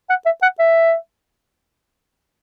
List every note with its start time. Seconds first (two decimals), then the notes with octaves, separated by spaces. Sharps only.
0.10 F#5
0.26 E5
0.42 F#5
0.59 E5